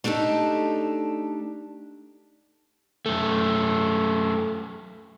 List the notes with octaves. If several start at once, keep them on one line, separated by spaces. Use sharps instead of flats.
A3 D4 D#4 G4 A4
F#2 A3